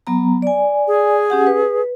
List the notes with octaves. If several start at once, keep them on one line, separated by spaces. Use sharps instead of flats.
F#3 B3 A#5
D5 G#5
G#4
C#4 G4 F#5
B4